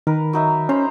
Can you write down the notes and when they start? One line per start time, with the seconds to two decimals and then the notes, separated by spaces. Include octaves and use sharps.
0.07 D#3 A#4 B4
0.33 F#3 D#4 E5
0.69 C#4 C5 A#5 B5